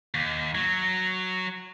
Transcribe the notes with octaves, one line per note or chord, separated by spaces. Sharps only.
D#2
F#3